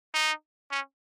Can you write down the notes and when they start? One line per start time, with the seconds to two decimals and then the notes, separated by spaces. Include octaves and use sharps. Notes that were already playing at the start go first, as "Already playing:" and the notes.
0.14 D#4
0.71 C#4